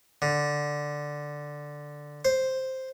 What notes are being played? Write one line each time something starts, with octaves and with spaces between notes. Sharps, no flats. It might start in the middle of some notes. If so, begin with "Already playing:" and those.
D3
C5